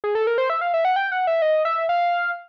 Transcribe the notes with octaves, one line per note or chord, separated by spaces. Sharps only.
G#4
A4
A#4
C5
E5
F5
E5
F#5
G5
F#5
E5
D#5
E5
F5